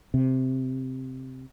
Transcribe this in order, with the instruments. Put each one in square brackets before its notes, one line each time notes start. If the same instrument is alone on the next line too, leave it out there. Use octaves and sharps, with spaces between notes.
[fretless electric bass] C3